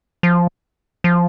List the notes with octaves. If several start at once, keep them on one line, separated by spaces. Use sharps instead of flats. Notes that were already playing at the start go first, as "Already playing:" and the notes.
F3
F3